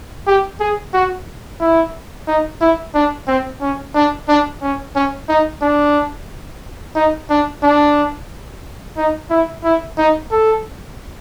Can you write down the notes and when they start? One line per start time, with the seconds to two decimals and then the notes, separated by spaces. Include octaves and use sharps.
0.27 G4
0.60 G#4
0.94 F#4
1.60 E4
2.28 D#4
2.61 E4
2.94 D4
3.28 C4
3.61 C#4
3.95 D4
4.28 D4
4.62 C#4
4.95 C#4
5.29 D#4
5.62 D4
6.96 D#4
7.30 D4
7.63 D4
8.97 D#4
9.30 E4
9.64 E4
9.98 D#4
10.31 A4